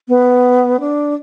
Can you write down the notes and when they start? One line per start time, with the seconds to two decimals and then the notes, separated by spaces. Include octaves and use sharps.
0.08 B3
0.80 D4